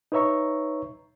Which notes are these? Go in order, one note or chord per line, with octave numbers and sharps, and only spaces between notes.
D#4 B4 C#5 E5 A#5 C#6